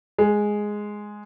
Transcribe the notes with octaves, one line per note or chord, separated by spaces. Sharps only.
G#3